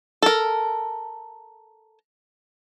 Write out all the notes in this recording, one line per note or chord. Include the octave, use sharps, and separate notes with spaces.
A4 A#4